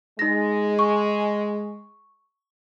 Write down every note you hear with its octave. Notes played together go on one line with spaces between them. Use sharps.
G#3 D#4 A#6
C#6